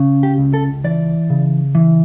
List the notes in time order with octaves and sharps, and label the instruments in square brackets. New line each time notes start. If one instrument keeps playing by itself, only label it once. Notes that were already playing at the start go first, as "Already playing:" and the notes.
Already playing: [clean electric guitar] C#3
G4
C#2
A4
E3 D5
C#3
E3